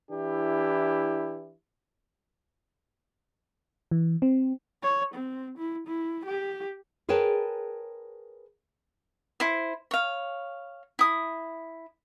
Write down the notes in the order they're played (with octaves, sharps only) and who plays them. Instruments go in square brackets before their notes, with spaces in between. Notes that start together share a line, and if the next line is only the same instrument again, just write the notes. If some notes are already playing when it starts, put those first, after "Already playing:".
[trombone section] E3 D4 E4 G4
[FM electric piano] E3
C4
[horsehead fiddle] C#5
C4
E4
E4
G4
[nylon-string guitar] G#4 A#4 B4 C#5 G5 A5
[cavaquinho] E4 C5
C#5 F5
E4 D#6